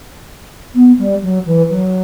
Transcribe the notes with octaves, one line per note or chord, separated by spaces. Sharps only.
B3
G3
F#3
E3
F#3